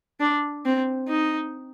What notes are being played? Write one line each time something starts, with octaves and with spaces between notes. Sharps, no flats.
D4
C4
D#4